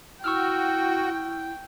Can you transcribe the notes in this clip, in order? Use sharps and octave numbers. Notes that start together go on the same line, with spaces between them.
E4 F#4 G5 C#6 E6 F6